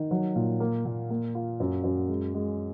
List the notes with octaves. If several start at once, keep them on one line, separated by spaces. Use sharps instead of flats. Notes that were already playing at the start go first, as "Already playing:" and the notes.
Already playing: D#3
F#3
A#2
A#3
A#2
A#3
F4
F#2
F#2
G#3
G#3